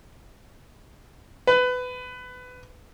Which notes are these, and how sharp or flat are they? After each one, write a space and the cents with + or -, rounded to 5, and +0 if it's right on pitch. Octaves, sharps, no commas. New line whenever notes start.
B4 +20